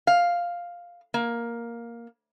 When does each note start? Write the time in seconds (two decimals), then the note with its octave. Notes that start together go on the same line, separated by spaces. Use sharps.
0.07 F5
1.14 A#3